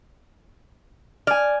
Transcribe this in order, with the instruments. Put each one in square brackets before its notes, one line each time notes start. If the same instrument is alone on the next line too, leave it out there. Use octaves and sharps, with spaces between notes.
[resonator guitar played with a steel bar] D5 [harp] G#5 F6